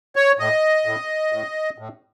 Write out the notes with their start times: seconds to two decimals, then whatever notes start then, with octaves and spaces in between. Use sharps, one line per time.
0.16 C#5
0.39 A2 D#5
0.86 A2
1.32 A2
1.78 A2